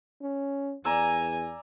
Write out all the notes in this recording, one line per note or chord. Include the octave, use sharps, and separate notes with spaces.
C#4
E2 D5 G#5 A#5 E6